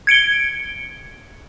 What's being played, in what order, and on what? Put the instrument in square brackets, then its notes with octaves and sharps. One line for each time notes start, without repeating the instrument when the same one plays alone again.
[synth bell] G#6 C#7 D7 G7